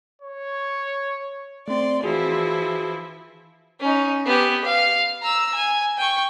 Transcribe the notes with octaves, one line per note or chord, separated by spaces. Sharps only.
C#5
A3 C4 D5 C6
E3 F3 E4 F#4 G#4
C#4 D#4
B3 G4
F5
A#5 E6
G#5
G5 C#6